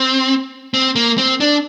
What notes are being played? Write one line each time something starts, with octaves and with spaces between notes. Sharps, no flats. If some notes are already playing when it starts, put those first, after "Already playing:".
Already playing: C4
C4
A#3
C4
D4